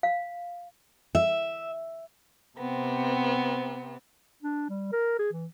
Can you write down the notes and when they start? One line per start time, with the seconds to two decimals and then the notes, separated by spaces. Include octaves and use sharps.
0.03 F5
1.15 E5
2.56 C3 B3 C4
4.42 D4
4.69 G3
4.92 A#4
5.19 G#4
5.32 E3